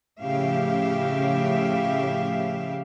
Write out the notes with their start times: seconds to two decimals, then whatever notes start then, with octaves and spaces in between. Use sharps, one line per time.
0.21 A2 C#3 F3 G4 E5 F5